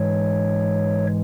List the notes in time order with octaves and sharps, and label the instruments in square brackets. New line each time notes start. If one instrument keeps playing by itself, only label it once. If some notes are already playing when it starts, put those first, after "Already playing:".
Already playing: [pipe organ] G#2 E3 G#3 C#5